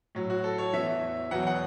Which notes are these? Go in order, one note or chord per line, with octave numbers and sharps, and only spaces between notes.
A2 F#3
F#4
A4
C#5
E2 E3 E5
E2 B2 F#3 F#5
F#5